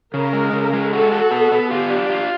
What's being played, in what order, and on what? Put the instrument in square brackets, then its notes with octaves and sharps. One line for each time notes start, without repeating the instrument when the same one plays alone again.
[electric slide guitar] C#3 [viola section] A#4
[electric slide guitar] G#3
C#3
G#3
[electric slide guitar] F#4 [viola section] A4
[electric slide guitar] F#4
B3
B3
[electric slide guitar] F4 [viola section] G4
[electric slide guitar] D4
F4